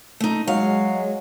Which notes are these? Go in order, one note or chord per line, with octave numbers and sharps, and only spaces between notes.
A3 D#4
F#3 G#3 F5